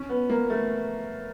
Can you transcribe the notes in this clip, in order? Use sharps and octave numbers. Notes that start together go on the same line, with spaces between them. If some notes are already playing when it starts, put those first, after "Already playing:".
Already playing: C#4
B3
A#3
A3